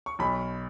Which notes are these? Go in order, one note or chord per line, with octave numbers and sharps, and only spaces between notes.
C#6
B1 B5